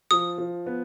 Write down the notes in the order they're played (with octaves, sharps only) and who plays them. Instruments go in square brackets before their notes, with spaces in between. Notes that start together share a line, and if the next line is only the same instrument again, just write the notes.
[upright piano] F3 [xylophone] D#6
[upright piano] F3
B3